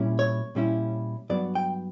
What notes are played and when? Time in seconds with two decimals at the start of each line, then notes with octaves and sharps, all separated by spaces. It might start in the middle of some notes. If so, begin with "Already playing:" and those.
Already playing: A#2 G3 C#4 E4
0.19 C#5
0.55 A#2 G3 C#4 E4
1.30 G2 F#3 B3 D5
1.55 G5